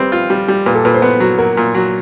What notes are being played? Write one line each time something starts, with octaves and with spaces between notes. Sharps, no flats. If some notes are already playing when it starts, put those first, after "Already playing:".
Already playing: G3 C4 B4
F4
G3
G3
A#2 B4
A4
A#2 B4
C5
B3 B4
F#3
F#3 A#4
A#2
F#3